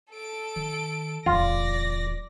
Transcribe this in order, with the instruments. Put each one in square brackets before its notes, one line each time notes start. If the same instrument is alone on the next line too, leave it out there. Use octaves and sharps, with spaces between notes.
[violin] A4 D7
[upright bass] D#3
[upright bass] D1 E2 [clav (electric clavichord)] F4 [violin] D5 A#6